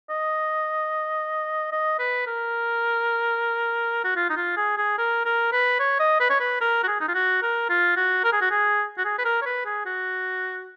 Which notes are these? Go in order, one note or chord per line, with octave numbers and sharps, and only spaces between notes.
D#5
D#5
B4
A#4
F#4
F4
D#4
F4
G#4
G#4
A#4
A#4
B4
C#5
D#5
B4
C#5
B4
A#4
F#4
G#4
D#4
F4
F#4
A#4
F4
F#4
A#4
G#4
F#4
G#4
F#4
G#4
B4
A#4
C#5
B4
G#4
F#4